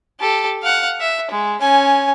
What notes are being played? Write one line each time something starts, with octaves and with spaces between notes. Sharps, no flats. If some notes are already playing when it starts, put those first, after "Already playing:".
G4 A4
F5 F#5
E5
G#3
C#4 G#5